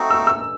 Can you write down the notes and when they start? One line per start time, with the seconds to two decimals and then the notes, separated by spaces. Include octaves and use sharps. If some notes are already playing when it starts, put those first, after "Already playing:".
Already playing: A3 C4 D#4 F#4
0.11 E6
0.27 E6